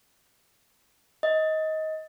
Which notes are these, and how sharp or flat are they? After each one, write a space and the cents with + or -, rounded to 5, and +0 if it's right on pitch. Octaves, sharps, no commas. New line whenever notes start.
D#5 +20